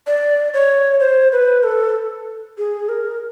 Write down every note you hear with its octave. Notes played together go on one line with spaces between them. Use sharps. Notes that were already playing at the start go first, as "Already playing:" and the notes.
D5
C#5
C5
B4
A4
G#4
A#4